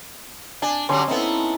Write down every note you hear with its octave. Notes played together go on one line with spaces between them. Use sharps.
D4 G#5
D3 F#3 G3 C#4 C6
B3 C4 D#4 E4 A4